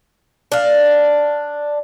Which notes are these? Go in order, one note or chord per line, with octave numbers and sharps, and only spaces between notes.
D4 F5